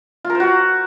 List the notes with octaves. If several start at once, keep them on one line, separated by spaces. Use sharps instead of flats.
F4
A#4
C5
F#4